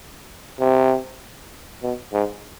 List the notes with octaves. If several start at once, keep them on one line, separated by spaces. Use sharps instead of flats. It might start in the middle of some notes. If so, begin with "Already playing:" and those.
C3
B2
G#2